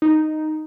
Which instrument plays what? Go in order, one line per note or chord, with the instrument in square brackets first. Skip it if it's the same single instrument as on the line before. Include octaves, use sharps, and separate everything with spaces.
[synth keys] D#4